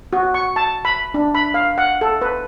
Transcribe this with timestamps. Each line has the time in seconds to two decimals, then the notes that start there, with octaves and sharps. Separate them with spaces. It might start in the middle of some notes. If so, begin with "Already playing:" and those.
0.13 F#4
0.34 C#6
0.56 A5
0.85 B5
1.14 D4
1.35 B5
1.54 F5
1.78 F#5
2.01 A4
2.22 B4